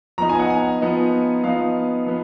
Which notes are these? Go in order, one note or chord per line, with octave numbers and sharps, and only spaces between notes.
F3 B3 D#4 A#5
G#5
F#5
G#5
F3 B3 D#4
F3 B3 D#4 F5
F3 B3